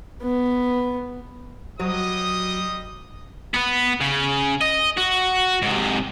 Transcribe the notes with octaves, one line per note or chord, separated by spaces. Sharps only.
B3
F#3 G3 D#5 D#6
B3 B4
C#3
D#5
F#4
G#2 C3